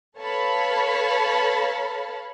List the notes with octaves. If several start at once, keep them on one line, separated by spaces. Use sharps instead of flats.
A4 B4 C#5 F5 A5 B5